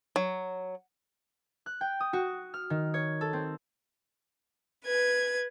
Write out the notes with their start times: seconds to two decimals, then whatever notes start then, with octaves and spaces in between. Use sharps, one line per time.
0.16 F#3
1.66 F#6
1.81 G5
2.00 D#6
2.13 F#4
2.54 F6
2.70 D#3
2.94 C#5
3.21 A4
3.33 C4
4.85 B4 G#6